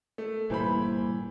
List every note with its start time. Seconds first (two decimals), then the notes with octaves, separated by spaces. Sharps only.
0.18 A3
0.50 G1 A#2 E3 G3 C5 B5